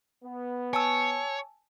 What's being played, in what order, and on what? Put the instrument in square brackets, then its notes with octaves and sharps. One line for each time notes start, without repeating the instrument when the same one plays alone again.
[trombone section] B3
[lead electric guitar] C#5 [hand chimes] G#5 A5 E6